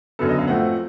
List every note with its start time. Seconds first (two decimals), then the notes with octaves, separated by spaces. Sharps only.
0.19 F#2 D3 F#3 B3 A4
0.29 D#5
0.39 F5
0.48 A2 F3 A3 C4 F#5